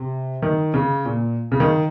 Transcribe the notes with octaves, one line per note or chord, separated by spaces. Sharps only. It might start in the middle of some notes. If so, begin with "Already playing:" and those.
Already playing: C3
D#3
C#3
A#2
C#3
D#3